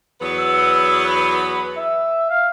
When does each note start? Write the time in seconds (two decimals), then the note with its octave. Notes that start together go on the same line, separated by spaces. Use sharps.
0.21 E2 F#3 B3
0.39 E6
1.05 B4
1.77 E5
2.29 F5